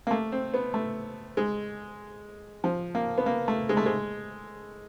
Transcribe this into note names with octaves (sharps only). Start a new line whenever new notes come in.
A#3
A3
C4
B3
A3
G#3
F3
A#3
B3
A#3
A3
G#3
A3
G#3